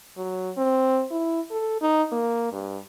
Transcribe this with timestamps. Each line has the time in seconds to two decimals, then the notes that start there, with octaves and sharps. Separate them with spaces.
0.17 F#3
0.57 C4
1.11 E4
1.51 A4
1.81 D#4
2.12 A#3
2.52 G2